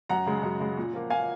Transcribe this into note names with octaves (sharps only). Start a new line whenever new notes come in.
F#2 F#5 A#5
C#3 G#3
F#2
C#3 G#3
A#2
F3 A#3
A#2 F5 G#5